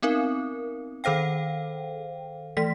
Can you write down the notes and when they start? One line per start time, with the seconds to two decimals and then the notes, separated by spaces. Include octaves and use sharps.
0.02 B3 C4 D#4 A#4
1.04 D#3 A4 C5 F5 G5
2.57 E3 A3 B6